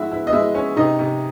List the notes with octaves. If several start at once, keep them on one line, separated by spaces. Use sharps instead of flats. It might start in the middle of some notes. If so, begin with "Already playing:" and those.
Already playing: G#3 E4 F#4 E5
E4
D#5
G#3 E4 E5
C#4
C3 D#4 D#5
C3